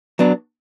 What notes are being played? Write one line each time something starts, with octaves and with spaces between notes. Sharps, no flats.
F#3 B3 D4